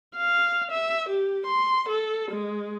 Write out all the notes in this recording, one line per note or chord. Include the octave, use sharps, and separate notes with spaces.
F5
E5
G4
C6
A4
G#3